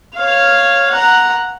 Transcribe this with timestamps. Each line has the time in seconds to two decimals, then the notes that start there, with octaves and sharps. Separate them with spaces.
0.16 C#5 F5
0.90 F#5 A#5